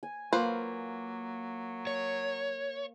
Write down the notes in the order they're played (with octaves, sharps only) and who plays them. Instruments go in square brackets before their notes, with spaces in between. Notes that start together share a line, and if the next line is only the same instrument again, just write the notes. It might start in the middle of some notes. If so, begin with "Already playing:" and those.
[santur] G#5
[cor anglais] F#3 [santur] A#3 [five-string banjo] F4 B4 C5
[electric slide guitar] C#5